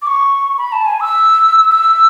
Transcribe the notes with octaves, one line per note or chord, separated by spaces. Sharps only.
D6
C#6
B5
A5
G#5
E6
E6